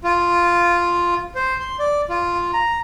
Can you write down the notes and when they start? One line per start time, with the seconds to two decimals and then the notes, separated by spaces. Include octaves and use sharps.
0.04 F4
1.35 C5
1.60 C6
1.79 D5
2.10 F4
2.54 A#5